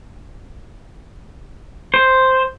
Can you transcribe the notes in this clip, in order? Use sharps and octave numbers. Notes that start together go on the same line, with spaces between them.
C5